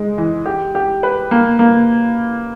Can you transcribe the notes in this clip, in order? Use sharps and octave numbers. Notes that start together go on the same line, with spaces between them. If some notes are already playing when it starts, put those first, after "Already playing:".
Already playing: G#3 D#4
E3
G4
G4
B4
A#3
A#3